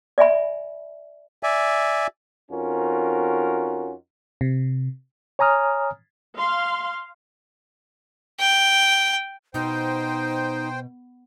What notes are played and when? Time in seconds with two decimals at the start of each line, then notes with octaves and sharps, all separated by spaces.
0.18 D5 E5 G#5 B5
1.43 D5 E5 G#5
2.51 F2 C#4 D#4 F4 F#4 A#4
4.41 C3
5.39 C#5 G#5 A#5 D#6 F6
6.38 F5 C6
8.40 G5
9.54 B2 D#4 C5 G5